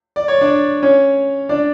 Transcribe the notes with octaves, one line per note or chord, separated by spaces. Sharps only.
D5
C#5
D4 D5
C#4 C#5
D4 D5